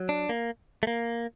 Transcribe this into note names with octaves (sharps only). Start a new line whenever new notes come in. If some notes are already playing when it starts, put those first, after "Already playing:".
Already playing: F#3
D4
A#3
A3
A#3